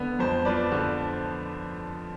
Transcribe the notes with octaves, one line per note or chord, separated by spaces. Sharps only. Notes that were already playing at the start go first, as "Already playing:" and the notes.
Already playing: D3 B3
F2 C5
F3 B4 D5
D3